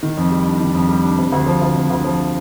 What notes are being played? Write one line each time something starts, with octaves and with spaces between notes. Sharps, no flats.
D#3
F2
G3
D4
D#3
F2
G3
D4
C3
D2
F3
D2
C3
D2
F3